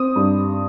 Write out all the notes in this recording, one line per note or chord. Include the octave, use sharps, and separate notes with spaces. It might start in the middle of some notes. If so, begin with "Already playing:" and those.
Already playing: C4 D#6
G2